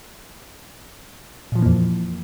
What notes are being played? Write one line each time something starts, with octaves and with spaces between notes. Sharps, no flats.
F2 A#2 E3 F3 A#3